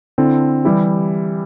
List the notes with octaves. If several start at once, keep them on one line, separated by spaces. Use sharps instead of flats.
D3 C4 E4 A4
E3 G3 E4 G4